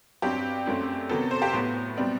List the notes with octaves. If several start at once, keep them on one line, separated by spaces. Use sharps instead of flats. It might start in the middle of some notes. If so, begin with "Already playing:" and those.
G2 F#3 C4 G4
F#2 F#3 A3 C4
C3 D#3 F#3 B3 A4
C5
G4
A2 F#3 B3
B2 G3 C4